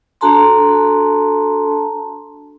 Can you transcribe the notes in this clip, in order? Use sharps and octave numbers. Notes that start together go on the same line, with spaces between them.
D4 F#4 A4 A5 A#5 C6